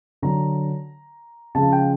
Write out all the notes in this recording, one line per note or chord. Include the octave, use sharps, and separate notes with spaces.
D3 F#3 A#5
C#3 F3 G#3 A5
G5